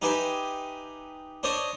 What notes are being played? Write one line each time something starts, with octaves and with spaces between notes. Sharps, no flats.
D#4 G4 B4 E5 G#5 C6
D4 C5 C#5 D#5